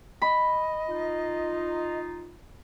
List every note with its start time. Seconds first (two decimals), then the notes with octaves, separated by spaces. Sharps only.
0.22 D#5 B5
0.88 D#4 F4